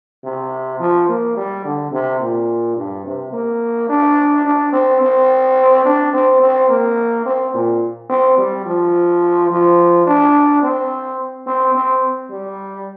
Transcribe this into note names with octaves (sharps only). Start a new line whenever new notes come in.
C3
F3
A#3
G3
D3
C3
A#2
G2
C3
A#3
D4
D4
C4
C4
D4
C4
C4
A#3
C4
A#2
C4
G3
F3
F3
D4
C4
C4
C4
G3